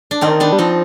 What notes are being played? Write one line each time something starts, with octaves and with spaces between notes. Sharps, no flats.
D4
D#3 C4 D#4
B3 D4
G3
F3 C4 D#4